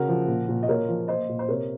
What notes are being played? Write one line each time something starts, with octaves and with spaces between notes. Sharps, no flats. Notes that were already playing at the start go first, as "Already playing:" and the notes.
Already playing: C#3 F#4 A#4
F3
A#2
A#2
D#5
A#2 A#4 C#5
F3
A#3 C5 D#5
A#2
C5
C3 A#4 C#5